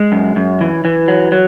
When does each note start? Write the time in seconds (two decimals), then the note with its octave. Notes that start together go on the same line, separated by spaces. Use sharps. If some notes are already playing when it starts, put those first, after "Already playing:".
Already playing: G#3
0.12 F#2
0.36 F#2
0.61 E3
0.85 E3
1.08 F#3
1.32 F#3